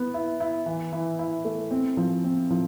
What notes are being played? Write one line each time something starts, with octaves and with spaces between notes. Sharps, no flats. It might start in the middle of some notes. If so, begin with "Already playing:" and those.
Already playing: B3
E4
E4
E3
E3
E4
A3
C4
F3
C4
F3